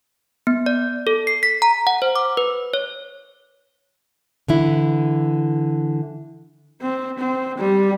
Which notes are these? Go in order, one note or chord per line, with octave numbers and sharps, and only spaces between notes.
B3
D5
A4
C7
B6
A#5
F#5
C5
D6
B4
C#5
D3 E3 E4
C4
C4
G3